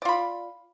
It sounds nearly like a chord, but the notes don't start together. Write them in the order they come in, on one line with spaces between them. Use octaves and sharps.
D5 F4 B5